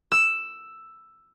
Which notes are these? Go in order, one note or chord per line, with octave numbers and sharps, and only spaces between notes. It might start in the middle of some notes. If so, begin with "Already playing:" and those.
E6